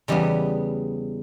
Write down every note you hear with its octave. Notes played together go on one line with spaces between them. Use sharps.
E2 C#3 G3 B3